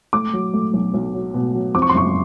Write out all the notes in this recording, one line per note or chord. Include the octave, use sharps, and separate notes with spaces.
A3 D6
F#3
A3
B1
B1
F#3
B2
F#3
F2 D6
C#6
C6
F#1 C#6